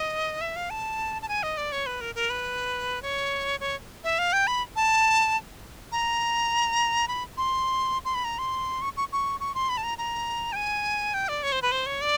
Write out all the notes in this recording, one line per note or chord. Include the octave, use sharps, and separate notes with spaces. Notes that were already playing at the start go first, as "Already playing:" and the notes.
Already playing: D#5
E5
F5
A5
A5
G#5
D#5
D5
C#5
B4
A#4
A#4
B4
C#5
C#5
E5
F5
G5
B5
A5
A#5
B5
C6
C6
B5
A#5
C6
C#6
C#6
C#6
C#6
C6
B5
A5
A#5
A#5
G5
G#5
G5
D5
C#5
C5
B4
C5
C#5
D5